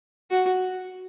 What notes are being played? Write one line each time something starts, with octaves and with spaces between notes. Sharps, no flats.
F#4